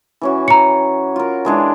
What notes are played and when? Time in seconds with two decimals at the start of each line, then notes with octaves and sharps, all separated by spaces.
0.21 E3 C#4 F#4
0.48 A#5 C#7
1.16 F4 A#4
1.45 E3 G#3 D4